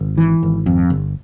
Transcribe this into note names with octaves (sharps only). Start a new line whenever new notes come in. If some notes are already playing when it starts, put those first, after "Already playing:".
Already playing: G#1
E3
G#1
F2
G1